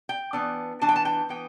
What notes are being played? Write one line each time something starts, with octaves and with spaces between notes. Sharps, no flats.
G5
E3 B3 D4
E3 B3 D4 A5
G5
A5
G5
E3 B3 G5